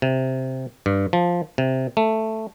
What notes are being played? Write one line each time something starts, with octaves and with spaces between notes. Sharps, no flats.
C3
G2
F3
C3
A3